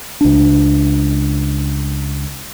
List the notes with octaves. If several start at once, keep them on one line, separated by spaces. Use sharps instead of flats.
C#2 D4